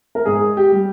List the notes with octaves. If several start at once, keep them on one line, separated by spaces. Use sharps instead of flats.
A#4
G#2 G#4
G4
G3